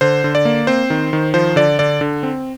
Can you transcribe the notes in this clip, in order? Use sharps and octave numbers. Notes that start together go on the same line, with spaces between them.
D3 C5
D3
D5
A#3
C4 C5
D#3
D#3
F3 C5
D3 D5
D3 D5
D3
C4